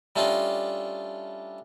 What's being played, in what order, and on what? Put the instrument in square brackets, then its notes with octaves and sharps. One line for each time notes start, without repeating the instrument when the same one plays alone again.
[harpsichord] G3 A3 C#4 D4 F4 D#5